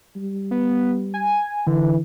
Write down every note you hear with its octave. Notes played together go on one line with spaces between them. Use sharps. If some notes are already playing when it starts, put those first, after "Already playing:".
G3
B3
G#5
D3 E3